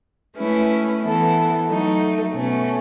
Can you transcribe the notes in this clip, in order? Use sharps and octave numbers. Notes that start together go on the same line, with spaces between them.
A3 C#4 E4 B4
E3 B3 E4 A4
F#3 A3 D#4
B2 A3 C#4